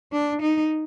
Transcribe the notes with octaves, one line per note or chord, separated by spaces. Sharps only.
D4
D#4